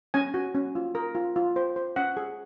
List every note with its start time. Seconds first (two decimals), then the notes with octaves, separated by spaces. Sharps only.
0.14 C#4 G#5
0.34 F#4
0.55 C#4
0.75 F4
0.95 A#4
1.15 F4
1.36 F4
1.56 C5
1.76 C5
1.96 C#4 F#5
2.17 G#4